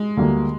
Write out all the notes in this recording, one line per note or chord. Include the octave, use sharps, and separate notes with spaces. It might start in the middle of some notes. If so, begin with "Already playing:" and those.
Already playing: G#3
D2 D3 G3 A#3